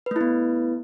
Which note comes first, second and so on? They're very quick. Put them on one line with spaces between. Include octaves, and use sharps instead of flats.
B4 A3 E4 B3